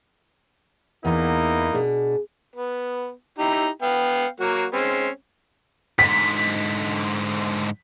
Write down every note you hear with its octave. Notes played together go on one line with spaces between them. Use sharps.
E2 A#3 B3 D#4 E4
B2 D4 G#4
B3
D#4 E4 G4
B3 F5 G5
F#3 A#3 F#4
G#3 C4 C#4
G#2 D3 B6